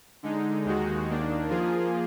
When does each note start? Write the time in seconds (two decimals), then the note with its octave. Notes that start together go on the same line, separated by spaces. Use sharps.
0.23 D3 G#3 D#4
0.65 D#2 D#3 G#3 D#4 F#4
1.08 D#2 D#3 A#3 D4
1.50 F3 A#3 F4 G#4